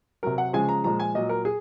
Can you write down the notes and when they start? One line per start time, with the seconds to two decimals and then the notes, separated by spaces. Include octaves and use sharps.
0.23 C3 F#3 A#4
0.38 F#5
0.53 C#3 F3 G#3 G#5
0.69 A#5
0.84 A#2 F3 G#3 A#5
1.00 G#5
1.14 A#2 F#3 D#5
1.29 A#4
1.45 G#4